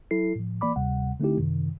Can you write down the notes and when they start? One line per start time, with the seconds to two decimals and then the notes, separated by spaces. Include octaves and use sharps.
0.11 F#3 E4 A4 C7
0.36 A2 F3
0.61 E3 A#3 D5 B5 D6
0.76 D2 C3 G3 F#5
1.20 D3 A3 C4 D#4 E4 G4
1.37 F#2 C3 D#3